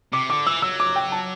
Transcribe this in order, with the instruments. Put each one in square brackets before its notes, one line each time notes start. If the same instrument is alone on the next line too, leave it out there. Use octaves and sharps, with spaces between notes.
[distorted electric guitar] C3 [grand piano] D6
[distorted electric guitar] D3 [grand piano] D6
[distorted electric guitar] E3 [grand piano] E6
[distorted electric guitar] F#3 [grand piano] E6
[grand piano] D6
G5
A5